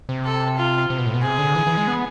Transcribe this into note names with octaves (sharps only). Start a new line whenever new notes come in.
C3
A4
F4
C3
B2
A2
B2
C3 G#4
D3
E3
E3
G#3
B3